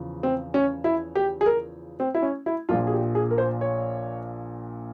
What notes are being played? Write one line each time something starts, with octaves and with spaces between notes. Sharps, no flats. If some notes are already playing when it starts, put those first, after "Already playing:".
Already playing: E2 C#3 F3
C4
C#4
E4
G4
G#4
A#4
C4
E4
C#4
E4
A#1 A#2 F3 F4
G#4
G4
G#4
A#4
C5
C#5